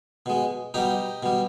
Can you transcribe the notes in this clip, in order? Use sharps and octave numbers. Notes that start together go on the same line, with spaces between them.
B2 G#3
B2 G3 D#4 G4
B2 G3